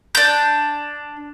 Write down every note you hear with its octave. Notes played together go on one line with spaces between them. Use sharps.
D4 G6